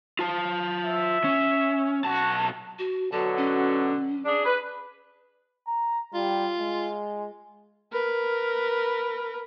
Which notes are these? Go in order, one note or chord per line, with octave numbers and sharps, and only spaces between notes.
F4 A5
E5
C#4
B1 F#4 A5
F#4
B2 D3 F#3 A5
C#4
D4 G#4
B4
A#5
G3 F4
G#3
A#4 B4